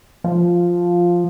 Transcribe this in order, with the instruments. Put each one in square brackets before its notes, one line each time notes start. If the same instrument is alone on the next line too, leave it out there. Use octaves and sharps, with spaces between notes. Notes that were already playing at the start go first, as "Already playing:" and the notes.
[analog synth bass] F3